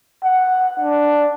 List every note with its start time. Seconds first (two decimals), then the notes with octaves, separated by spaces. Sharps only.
0.24 F#5
0.80 D4